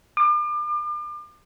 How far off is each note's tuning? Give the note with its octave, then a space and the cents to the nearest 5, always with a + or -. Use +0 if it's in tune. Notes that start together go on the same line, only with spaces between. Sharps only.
D6 +40